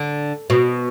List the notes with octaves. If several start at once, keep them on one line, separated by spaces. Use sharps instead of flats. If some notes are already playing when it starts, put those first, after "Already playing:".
Already playing: D3
B2